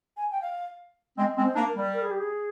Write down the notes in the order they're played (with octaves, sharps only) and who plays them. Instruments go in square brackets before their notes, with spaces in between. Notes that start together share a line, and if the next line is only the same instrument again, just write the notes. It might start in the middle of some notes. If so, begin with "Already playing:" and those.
[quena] G#5
G5
F5
[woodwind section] G#3 C4 [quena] D#5
[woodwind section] G#3 C4
[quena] C5
[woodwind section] A#3 D4
[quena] A#4
[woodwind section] G3
[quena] A#4
G#4
G4
G#4